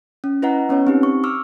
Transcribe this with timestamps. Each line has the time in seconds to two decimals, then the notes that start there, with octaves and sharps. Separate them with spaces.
0.24 C#4
0.42 E4 B4 D#5 F#5 A#5
0.69 B3 C#4 B4 C#5
0.87 C4 D#4 G4
1.03 C#6
1.24 C#6 D6 E6 F6